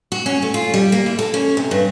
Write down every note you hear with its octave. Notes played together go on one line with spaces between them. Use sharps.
F#4
C#4
A3
F4
G3
A#3
E4
A4
C#4
C3
G2